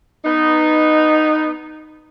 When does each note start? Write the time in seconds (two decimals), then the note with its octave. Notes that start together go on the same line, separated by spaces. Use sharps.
0.25 B3 D#4